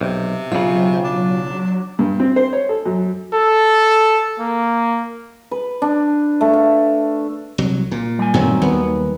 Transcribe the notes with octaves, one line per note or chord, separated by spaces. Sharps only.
B1 C3
B1 C#3 F#3 F4
D4
G2
C4
C5
C#5
A4
F#2
A4
A#3
B4
D4
A3
F5
C2 F#3
A#2
G3 G#5
F#2 A#2 D#3 F#3 A3 C4
D#2 B3